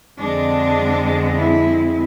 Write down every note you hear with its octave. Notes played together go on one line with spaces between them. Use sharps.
F2 D3 G#3 C4 D4
E4